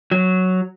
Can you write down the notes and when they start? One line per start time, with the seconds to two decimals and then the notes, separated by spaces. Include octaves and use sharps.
0.11 F#3